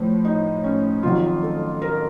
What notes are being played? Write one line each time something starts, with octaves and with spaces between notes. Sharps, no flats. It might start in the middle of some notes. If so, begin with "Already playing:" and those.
Already playing: A2 F3
D#4
C#4
F2 D#3 F#3 F4
A4
A#4